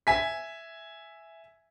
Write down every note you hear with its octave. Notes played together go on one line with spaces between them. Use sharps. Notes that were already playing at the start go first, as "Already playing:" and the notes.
E5 G#5 B6